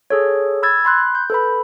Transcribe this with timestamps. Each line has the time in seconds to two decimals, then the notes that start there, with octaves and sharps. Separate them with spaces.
0.10 G#4 A4 C#5
0.63 B5 E6 G#6 A6
0.85 B5 C6 F#6
1.15 G6
1.30 A4 B4 B5